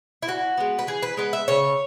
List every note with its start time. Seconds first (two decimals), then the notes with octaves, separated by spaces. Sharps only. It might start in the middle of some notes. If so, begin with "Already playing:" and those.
0.22 E4
0.27 E3 F#4
0.57 G#3 B3
0.79 B4
0.87 E3 G#4
1.03 B4
1.17 G#3 B3 B4
1.33 E5
1.48 C#3 C#5